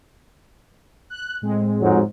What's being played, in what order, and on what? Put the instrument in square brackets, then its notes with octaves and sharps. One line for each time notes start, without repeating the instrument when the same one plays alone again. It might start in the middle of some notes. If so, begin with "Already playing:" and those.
[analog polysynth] F#6
A2 G#3 C4
[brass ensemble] F2 G#2 F#3